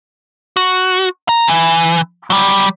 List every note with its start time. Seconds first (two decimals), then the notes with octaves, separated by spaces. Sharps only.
0.57 F#4
1.29 A#5
1.47 E3
2.30 F#3 G3